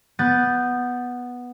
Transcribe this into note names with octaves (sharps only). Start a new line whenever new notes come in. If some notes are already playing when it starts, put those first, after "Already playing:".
B3 G6 A6